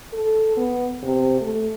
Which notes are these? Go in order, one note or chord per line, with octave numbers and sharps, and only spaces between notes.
A4
B3
C3
A3